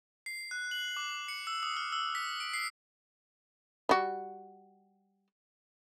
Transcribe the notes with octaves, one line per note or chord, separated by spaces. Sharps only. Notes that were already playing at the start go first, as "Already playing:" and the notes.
C7
F#6
F#7
D6
C#7
E6
D#6
F6
E6
B6
D7
C7
G3 F#4